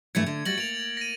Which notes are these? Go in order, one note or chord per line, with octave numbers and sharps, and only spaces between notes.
G2 E3 A3 G#6 C#7
D3
G3 F#4 A6 A#6 F#7
A#3 D7 F7
A#6 D#7